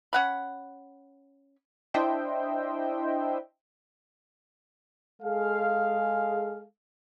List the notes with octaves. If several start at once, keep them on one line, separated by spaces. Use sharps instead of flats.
C#4 F#5 B5
D4 E4 C5 D#5 E5 G5
G#3 G#4 A4 F5